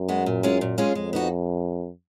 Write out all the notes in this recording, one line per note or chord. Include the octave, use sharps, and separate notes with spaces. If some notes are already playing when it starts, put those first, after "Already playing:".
Already playing: F#2
G#3 B3 F#4
A#2
G#3 C#4 F4 G#4
A#2
G#3 C#4 F4 G#4
F2 G#3
B3 D#4 F#4